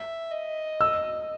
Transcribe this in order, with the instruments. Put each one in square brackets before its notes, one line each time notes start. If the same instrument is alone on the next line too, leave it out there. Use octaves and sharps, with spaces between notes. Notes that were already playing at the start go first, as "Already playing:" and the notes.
Already playing: [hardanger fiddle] E5
D#5
[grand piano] E6